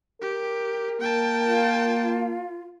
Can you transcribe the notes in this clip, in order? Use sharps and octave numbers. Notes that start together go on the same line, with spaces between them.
G4 A#4
A#3 G5 A5
F4